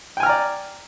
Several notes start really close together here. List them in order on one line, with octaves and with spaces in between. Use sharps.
G5 G#5 F6 A#5 D5